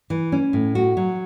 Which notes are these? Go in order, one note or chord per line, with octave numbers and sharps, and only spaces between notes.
E3
C#4
A2
F#4
F#3